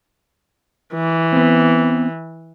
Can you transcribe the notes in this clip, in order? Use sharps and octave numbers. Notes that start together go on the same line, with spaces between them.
E3
B3 C4